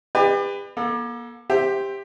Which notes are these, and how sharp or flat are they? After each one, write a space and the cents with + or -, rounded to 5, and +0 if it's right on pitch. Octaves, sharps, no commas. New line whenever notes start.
G4 +40 B4 +20 D5 +35
A#3 +40 A4 +0
G4 +10 C5 +0 E5 +0